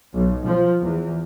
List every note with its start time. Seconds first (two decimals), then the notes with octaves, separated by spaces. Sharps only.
0.13 B1
0.46 F3
0.79 E2